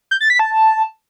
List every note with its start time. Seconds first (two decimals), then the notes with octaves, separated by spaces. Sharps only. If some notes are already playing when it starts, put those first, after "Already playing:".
0.11 G6
0.21 A6
0.30 B6
0.39 A5